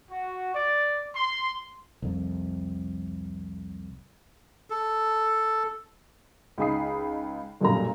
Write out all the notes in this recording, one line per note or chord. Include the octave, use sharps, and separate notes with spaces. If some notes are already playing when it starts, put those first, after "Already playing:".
F#4
D5
C6
C2 F2
A4
C#2 D#4 G#4 B5 D#6 C7
B1 F#2 A#2 G3 A4 A#5